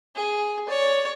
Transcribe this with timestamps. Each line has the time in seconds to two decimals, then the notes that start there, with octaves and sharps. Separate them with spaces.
0.15 G#4
0.67 C#5 D5